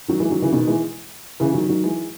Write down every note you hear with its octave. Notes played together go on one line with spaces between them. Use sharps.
D#3 F#3
E3 G#3
D#3 F#3
C#3 E3
B2 D#3
E3 G#3
C#3 E3
D#3 F#3
D#3 F#3
E3 G#3